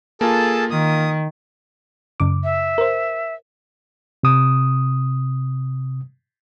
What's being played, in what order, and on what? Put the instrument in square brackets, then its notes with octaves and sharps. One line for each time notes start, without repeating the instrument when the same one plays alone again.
[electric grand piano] A#3 F4 [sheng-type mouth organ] G#4 A4 A5
[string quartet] D#3 [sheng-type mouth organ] D#6
[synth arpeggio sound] F#2 C#3 D6
[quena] E5
[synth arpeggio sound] A#4 C5
[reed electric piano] C3 D#6